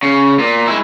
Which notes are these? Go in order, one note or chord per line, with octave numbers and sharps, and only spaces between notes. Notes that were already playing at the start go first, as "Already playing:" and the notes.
C#3
A#2
G#3 E4